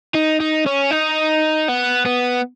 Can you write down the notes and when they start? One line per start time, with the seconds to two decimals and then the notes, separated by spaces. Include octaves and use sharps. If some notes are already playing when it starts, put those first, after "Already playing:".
0.15 D#4
0.40 D#4
0.66 C#4
0.91 D#4
1.69 B3
2.06 B3